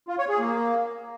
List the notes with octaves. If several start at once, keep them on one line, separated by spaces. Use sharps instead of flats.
F4
C#5
G#4
A#3